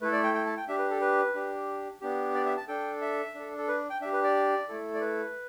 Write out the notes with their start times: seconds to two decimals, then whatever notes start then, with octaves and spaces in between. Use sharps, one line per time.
0.01 A3 E4 A4 B4
0.13 D5
0.24 G5
0.34 G5
0.46 A5
0.57 G5
0.68 D4 G4 E5
0.79 B4
0.90 A4
1.01 B4
1.35 D4 G4
2.01 B3 D4 G4
2.35 D5
2.46 E5
2.57 A5
2.68 D4 A4 G5
3.01 E5
3.35 D4 A4
3.58 A4
3.68 B4
3.90 G5
4.01 D4 E5
4.05 G4
4.13 B4
4.24 D5
4.68 A3 E4 A4
4.94 D5
5.01 B4